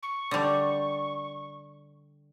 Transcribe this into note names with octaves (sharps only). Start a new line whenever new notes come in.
C#6
D3 G3